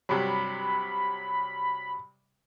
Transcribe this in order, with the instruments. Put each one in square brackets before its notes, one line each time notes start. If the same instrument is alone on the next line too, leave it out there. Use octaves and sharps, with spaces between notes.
[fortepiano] G2 C3 F#3 [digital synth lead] B5